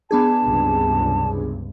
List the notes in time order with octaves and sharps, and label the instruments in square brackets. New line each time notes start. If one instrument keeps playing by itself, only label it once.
[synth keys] B3 D4 G#4 [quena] A5
[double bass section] C#2 G2 C3